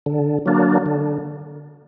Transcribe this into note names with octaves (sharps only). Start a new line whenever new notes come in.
D3
F#3 A#3 D4
D3